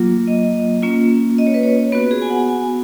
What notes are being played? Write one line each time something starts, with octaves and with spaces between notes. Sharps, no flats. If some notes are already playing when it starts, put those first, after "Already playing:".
Already playing: F#3 A#3 F4
D#5
A#3 C#4 F4
D#5
C#5
B4
C#5
B3 F#4 B4
G#4
G#5
F#5
G#5